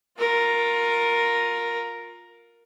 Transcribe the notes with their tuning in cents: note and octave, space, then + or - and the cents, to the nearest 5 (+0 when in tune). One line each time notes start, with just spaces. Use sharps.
F4 +25 A#4 +0